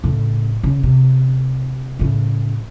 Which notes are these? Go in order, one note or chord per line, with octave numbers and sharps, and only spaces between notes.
A2 C#3
C#3
C3
A2 C#3